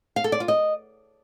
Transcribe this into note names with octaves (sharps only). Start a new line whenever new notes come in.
F5
A4
D5
F4
D#5